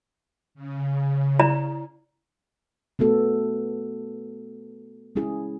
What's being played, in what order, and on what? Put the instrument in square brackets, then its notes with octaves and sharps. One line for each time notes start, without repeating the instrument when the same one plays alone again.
[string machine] C#3
[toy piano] E4 D5 A#5
[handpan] A3 B3 F#4 A4
G#3 C#4 E4 G#4